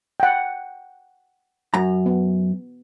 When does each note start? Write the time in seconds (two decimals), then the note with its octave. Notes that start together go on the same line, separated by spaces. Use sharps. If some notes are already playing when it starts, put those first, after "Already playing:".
0.20 F#5 G5
1.74 F#2 A#5
2.06 B3